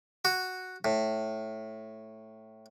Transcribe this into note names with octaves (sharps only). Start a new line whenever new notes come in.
F#4
A2